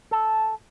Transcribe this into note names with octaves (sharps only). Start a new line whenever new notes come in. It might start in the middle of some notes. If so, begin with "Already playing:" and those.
A4